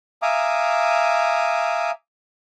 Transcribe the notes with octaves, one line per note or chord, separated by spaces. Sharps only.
E5 F5 G#5 A#5 D6 D#6